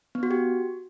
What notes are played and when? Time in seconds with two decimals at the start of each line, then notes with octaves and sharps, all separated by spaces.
0.15 B3
0.23 F#4
0.31 G4